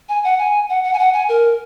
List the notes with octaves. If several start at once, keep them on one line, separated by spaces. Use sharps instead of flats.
G#5
F#5
G#5
F#5
F#5
G#5
F#5
G#5
A#4